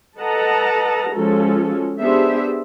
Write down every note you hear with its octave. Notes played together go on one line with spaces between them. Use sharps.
A4 B4 D#5 F#5 A5 A#5
F3 G#3 C#4 F#4 A4
B3 D4 G4 G#4 C5 E5